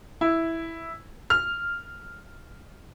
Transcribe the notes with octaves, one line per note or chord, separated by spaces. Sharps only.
E4
F6